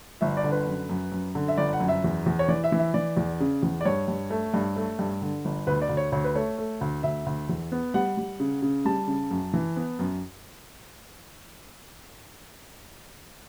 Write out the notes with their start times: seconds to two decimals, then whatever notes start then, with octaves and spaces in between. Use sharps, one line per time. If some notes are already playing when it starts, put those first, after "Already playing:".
0.21 G1 E5
0.37 D5
0.44 D3
0.52 B4
0.67 F#2
0.89 F#2
1.12 F#2
1.35 D3
1.48 E5
1.58 G1 D5
1.73 F#5
1.80 F#2
1.88 E5
2.04 E2
2.26 E2
2.39 C#5
2.48 E3 D5
2.64 E5
2.72 E3
2.79 E5
2.94 E3 D5
3.17 E2
3.40 C#3
3.63 E2
3.81 D5
3.85 G2 C#5
4.08 G2
4.30 A3
4.54 G2
4.76 A3
4.99 G2
5.22 D3
5.45 G1
5.67 D2 B4
5.82 D5
5.89 D2
5.97 C#5
6.12 D2 C#5
6.24 B4
6.35 A3 C#5
6.58 A3
6.81 D2
7.03 D2 E5
7.26 D2
7.49 E2
7.72 B3
7.94 G3 F#5
8.17 G3
8.40 C#3
8.62 C#3
8.85 G3 A5
9.08 C#3
9.31 F#2
9.54 E3
9.77 B3
9.99 F#2